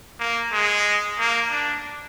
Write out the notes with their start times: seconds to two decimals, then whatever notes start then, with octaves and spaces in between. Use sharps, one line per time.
0.19 A#3
0.52 G#3
1.19 A#3
1.51 D4